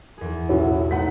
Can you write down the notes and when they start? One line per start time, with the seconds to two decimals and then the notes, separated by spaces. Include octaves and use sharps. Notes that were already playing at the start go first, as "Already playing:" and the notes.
0.18 E2 G#4
0.49 B1 A2 C#4 E4 F#4
0.91 A3 D#4 E4 F#5 B6